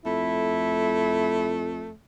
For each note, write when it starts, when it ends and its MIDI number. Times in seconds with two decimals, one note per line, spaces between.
0.06 1.89 41
0.06 1.92 57
0.06 1.67 64